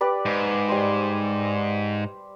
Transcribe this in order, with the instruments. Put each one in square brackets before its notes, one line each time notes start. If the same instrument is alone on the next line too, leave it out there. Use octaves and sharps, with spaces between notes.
[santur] G4 B4 D5
[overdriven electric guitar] G#2
[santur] G3 C5